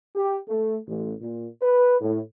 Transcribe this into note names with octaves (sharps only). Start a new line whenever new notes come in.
G4
A3
A1
A#2
B4
A2